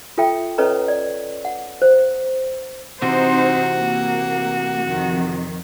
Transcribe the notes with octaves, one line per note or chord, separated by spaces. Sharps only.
F4 A4 E5 G5
C#4 A4 B4 C#5 D#5 A#5
D5
F#5
C5
C3 E3 C4 D#4 F#4 C5
A#3
F2 D#3